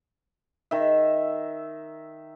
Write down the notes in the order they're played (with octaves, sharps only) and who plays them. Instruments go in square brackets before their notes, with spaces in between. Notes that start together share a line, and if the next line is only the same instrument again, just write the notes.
[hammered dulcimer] D#3 E5